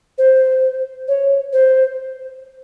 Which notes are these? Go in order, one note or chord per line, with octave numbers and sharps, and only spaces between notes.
C5
C#5
C5